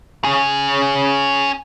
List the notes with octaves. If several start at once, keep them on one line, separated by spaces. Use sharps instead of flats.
C#4 G#4